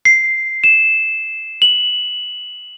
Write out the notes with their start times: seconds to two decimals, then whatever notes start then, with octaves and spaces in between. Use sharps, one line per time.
0.05 C7
0.64 E7
1.62 F#7